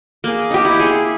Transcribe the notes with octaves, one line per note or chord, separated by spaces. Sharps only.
A#3 G#4
D#4 G4
E4
G#4 C6